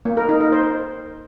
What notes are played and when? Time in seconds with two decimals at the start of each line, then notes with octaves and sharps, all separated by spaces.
0.05 A#3
0.17 A#4
0.29 D#4
0.41 A#4
0.52 C5